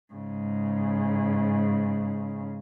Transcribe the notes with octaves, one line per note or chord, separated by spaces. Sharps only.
G#2 C#3